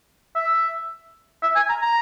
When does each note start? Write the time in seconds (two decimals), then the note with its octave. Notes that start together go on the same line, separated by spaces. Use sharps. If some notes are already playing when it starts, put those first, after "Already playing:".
0.35 E5
1.43 E5
1.56 G#5
1.69 A#5
1.82 A#5